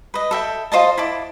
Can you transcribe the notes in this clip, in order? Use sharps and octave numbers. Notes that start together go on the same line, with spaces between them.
B4 D#5
A4 E5 G5
F4 C5 D#5 A5
E4 A5 D6